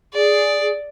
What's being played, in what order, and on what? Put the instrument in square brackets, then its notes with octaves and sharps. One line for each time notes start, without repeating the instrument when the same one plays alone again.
[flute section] G#4 [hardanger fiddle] D5